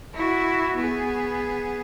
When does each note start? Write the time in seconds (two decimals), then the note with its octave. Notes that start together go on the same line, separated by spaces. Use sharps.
0.14 E4 F#4
0.76 B3 G#4